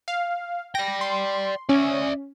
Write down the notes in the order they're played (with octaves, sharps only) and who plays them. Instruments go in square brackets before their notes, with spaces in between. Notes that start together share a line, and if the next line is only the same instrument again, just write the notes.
[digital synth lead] F5
[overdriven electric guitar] D5 G5 [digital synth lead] A#6
[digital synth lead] C6
[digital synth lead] C#4 [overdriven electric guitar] D5 E5